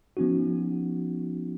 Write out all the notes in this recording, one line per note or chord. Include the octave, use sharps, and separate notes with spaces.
F3 B3 C#4 D#4 F#4